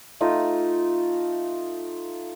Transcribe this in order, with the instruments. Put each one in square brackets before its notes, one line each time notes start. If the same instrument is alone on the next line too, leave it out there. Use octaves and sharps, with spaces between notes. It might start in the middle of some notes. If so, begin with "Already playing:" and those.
[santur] A3 D#4 F4